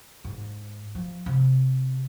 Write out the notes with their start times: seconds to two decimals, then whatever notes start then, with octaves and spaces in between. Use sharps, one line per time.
0.24 G#2
0.95 F3
1.26 C3